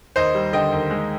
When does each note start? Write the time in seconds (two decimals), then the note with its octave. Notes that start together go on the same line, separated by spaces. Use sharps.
0.16 D#2 C5 D#5
0.34 G3
0.53 D3 D#5 G5
0.72 D#2
0.91 G#3